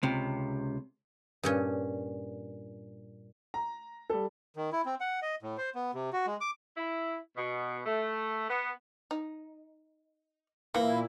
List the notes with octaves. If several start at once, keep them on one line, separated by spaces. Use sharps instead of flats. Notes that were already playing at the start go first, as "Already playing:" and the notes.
C#2 C3
G2 A#2 C#4
A#5
G3 A4
D#3
E4
C4
F#5
D#5
A2
C5
B3
C3
F#4
G#3
D6
E4
B2
A3
B3
D#4
A#2 E3 A#3 E4